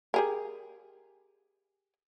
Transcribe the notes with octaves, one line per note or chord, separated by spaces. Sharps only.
G4 G#4 A#4